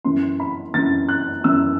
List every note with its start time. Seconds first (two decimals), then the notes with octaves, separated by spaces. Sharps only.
0.05 F#2 E3 C6
0.40 B5
0.74 F#2 E3 A6
1.09 F#6
1.44 F#2 E3 E6